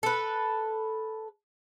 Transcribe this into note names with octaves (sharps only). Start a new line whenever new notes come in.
A4 B4